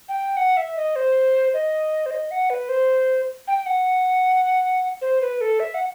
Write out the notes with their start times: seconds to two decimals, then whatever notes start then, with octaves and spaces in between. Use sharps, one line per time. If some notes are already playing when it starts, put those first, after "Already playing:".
0.09 G5
0.37 F#5
0.57 E5
0.76 D#5
0.96 C5
1.54 D#5
2.06 C5
2.11 D#5
2.31 F#5
2.50 B4
2.69 C5
3.47 G5
3.66 F#5
5.01 C5
5.21 B4
5.41 A4
5.60 E5
5.74 F#5